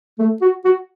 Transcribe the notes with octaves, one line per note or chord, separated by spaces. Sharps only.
A3
F#4
F#4